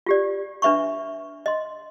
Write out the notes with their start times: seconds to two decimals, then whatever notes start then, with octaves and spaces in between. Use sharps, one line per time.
0.06 F4 G4 D5
0.62 D4 B4 E5 B5 C#6
1.46 D#5 C6